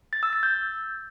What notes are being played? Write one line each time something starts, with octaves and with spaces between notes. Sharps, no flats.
A6
E6
A6
G6